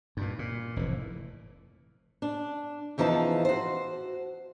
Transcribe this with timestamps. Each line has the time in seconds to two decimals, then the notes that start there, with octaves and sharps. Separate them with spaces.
0.17 G2 A#2
0.39 A#2
0.76 F1 A2 E3
2.22 D4
2.98 E2 E3 F3 D#4 A5
3.45 F#4 C5